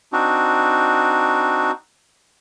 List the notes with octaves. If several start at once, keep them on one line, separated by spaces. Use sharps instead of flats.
C4 D4 D#4 F#4